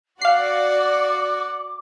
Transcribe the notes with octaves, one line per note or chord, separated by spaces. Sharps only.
F#4 D5 F5 F#5 D6 C7